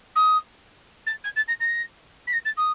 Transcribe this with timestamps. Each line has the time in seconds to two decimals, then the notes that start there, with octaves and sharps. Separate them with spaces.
0.15 D#6
1.06 A6
1.24 G#6
1.36 A6
1.48 A#6
1.60 A#6
2.27 B6
2.32 A#6
2.45 A6
2.57 D#6